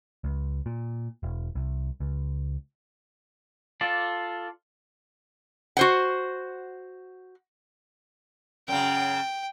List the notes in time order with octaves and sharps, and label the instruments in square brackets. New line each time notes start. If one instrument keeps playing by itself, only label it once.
[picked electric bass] C#2
A#2
E1
C2
C#2
[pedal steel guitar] F4 A4 D5
[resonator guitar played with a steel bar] F#4 C5 F#5
[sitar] F#2 C#3 [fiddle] G5